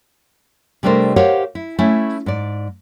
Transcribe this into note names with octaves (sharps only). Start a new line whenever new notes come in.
C3 G3 A3 D4 A#4 C5
G4 A#4 C5 C#5 F5 F#5
E4
A3 C#4 E4
G#2 D5